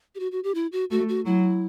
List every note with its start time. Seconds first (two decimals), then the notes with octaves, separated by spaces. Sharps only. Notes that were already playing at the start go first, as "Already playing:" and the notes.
0.15 G4
0.20 F#4
0.32 F#4
0.44 G4
0.55 E4
0.72 F#4
0.91 A3 F#4
1.09 F#4
1.26 F#3 E4